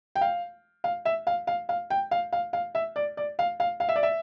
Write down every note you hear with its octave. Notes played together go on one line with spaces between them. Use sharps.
G5
F5
F5
E5
F5
F5
F5
G5
F5
F5
F5
E5
D5
D5
F5
F5
F5
E5
D5
E5